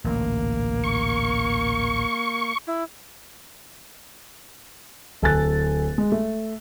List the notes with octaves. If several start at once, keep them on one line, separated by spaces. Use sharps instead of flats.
A1 D2 A#2 A#3
C#6
E4
D1 A4 G#5 F#6 A6
G#3
A3